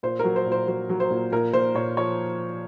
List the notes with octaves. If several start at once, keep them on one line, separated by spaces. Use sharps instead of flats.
A#2 C5
F#3 A#4
C5
A#2
C5
F#3 C5
F#3
C5
A#2
A#2 A#4
A#2 C5
A#2 C#5
F3 C#5